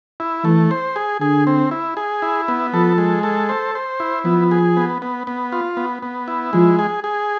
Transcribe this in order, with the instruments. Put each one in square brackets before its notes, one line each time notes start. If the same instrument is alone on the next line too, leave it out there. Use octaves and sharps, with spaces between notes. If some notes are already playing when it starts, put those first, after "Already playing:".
[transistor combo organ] E4
[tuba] E3 [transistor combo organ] A3
[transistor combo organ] C5
G#4
[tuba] D3 [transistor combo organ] G#4
[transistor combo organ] C4
E4
G#4
E4
B3
[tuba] F3 [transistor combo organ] A4
[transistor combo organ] G#3
A4
C5
C5
E4
[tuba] F3 [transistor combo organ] B3
[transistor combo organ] G#4
B3
B3
B3
F4
B3
B3
E4
[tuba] F3 [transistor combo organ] G#3
[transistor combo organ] G#4
G#4